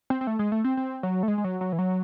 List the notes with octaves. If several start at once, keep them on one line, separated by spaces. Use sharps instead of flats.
C4
C4
A3
G#3
A3
C4
C4
F#3
A3
G#3
G#3
F#3
F#3
E3
F#3